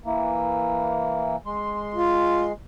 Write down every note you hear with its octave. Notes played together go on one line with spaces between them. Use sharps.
E3 A#3
G#3 C6
F4